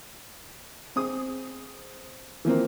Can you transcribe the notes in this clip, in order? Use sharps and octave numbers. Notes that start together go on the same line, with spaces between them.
C4 G#4 D#6
E3 F3 A#3 C4